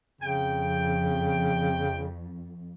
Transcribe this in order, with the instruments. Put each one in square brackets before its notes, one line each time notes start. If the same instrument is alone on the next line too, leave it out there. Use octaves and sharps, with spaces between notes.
[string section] F2 [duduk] C#3 [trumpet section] G5